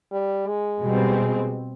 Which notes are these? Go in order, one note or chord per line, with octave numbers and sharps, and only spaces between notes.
G3
G#3
B2 G3 C4